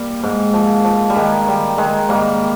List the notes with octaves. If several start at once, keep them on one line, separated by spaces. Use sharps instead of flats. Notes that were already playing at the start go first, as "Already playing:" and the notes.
Already playing: G3 A#3
G#2
F3
F3
G3
D#3 G#3
D#3 G3
D#3 G#3
G#2 G3 A#3